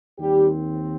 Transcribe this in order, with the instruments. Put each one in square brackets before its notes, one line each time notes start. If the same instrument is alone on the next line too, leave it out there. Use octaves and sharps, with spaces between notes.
[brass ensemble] D#2 D#3 G3 C4 G4